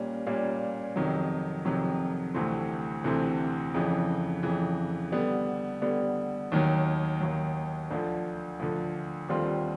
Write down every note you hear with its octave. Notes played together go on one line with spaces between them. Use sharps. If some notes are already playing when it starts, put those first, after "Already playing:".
Already playing: A#2 G3 A#3 C#4
A#2 G3 A#3 C#4
F2 C3 D#3 F#3
F2 C3 D#3 F#3
D2 C3 E3 A3 C4
D2 C3 E3 A3 C4
F2 C#3 E3
F2 C#3 E3
D3 G3 B3
D3 G3 B3
D#2 D#3 F#3
D#2 D#3 F#3
D2 D3 F3
D2 D3 F3
D#2 D3 G3 C4 F4